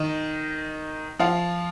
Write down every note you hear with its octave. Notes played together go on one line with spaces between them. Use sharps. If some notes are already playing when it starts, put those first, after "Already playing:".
Already playing: D#3 D#4
F3 F4